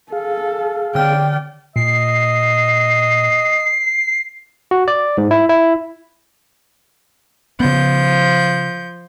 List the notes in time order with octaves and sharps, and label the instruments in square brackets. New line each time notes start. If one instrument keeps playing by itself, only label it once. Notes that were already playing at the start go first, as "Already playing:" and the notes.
[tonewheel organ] G#4 F5 [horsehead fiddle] A4
[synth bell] D3 F6 [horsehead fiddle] D5 G5
[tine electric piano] A#2 [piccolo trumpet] D#5 [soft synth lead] C7
[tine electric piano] F#4
D5
G#2
E4
E4
[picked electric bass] C#3 B3 [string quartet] F3 G6